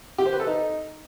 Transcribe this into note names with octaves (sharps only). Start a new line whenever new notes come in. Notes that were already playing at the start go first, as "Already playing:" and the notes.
G4
C5
B4
A4
D#4